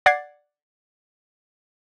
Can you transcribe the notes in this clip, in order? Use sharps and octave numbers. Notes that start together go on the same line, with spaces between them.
D5 F#5 D6 G#6 A6 C7